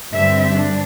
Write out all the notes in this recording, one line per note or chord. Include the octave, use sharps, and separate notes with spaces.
G2 D3 G3 C4 E5
D4